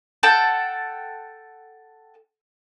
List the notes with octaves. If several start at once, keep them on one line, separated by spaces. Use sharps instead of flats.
A4 F#5 G5 A5